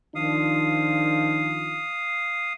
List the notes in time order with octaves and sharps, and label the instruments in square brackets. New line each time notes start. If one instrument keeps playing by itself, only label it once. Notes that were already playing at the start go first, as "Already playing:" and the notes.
[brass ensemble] D#3 F3 D4 [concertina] F5 D#6